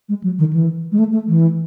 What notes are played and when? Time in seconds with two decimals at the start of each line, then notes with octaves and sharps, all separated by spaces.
0.09 G#3
0.24 F#3
0.39 D#3
0.53 E3
0.92 G#3
0.98 A3
1.13 A3
1.28 E3